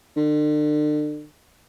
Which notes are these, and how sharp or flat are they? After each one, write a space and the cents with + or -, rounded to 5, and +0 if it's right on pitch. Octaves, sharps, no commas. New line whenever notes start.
D3 +40